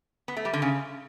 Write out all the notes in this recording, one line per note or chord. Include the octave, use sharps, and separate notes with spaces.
B3
A3
G3
D3
C#3